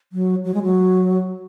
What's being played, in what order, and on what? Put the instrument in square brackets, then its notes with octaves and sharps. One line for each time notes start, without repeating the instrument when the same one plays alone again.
[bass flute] F#3
F#3
G#3
F#3